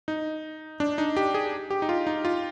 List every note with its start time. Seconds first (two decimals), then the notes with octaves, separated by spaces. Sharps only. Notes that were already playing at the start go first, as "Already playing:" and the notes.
0.08 D#4
0.80 D4
0.98 D#4
1.17 G4
1.34 G#4
1.70 G4
1.82 D#4
1.89 F4
2.07 D#4
2.25 F4